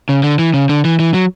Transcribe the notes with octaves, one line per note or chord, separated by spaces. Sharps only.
C#3
D3
E3
C#3
D3
E3
E3
F#3